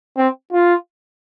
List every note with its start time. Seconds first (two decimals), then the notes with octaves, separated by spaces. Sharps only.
0.17 C4
0.53 F4